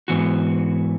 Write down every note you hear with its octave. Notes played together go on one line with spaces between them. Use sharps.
G#2 E3 B3 F#4